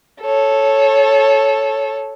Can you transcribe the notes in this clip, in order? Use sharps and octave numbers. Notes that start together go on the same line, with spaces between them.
A4 C#5